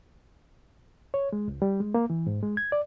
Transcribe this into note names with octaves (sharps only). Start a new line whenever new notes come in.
C#5
G#3
C#2
G3
G#3
A#3
E3
G#2
G#3
G#6
D5